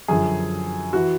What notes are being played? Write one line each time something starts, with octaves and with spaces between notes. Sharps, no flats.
F#2 D3 F3 G#4
E3 F#4